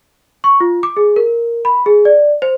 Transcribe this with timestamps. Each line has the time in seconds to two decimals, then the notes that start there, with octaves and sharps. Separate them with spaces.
0.44 C#6
0.60 F4
0.83 D6
0.97 G#4
1.16 A#4
1.65 B5
1.86 G#4
2.05 D5
2.42 C5